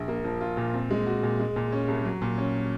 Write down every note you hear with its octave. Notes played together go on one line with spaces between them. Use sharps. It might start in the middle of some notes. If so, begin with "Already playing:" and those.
Already playing: A#1
A#3
F3
F4
A#2
C4
G#3
F#4
A#2
G#3
A#2
C#4
C2
F#3
A#2
C#4